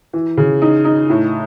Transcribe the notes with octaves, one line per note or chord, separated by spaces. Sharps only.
E3
C#3
D#4
D#4
A2